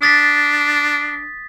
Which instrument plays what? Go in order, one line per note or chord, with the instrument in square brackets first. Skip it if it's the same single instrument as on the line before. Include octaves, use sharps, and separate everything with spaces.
[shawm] D4 [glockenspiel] D#6 A6 B6